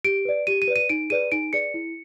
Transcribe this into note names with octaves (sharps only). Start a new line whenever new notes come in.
G4 D7
B4 D5
G4 D#7
D#7
B4 D5
D#7
D#4 D7
G#4 B4 D5 D#7
D#4 D7
G#4 B4 D5 C#7
E4